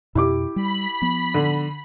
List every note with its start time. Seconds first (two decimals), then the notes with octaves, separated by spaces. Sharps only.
0.15 F2 B2 E4 G4 D6
0.56 G3 B5
1.02 F3 B3
1.34 D3